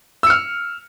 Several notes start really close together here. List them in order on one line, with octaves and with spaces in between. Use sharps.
E6 C#7 F6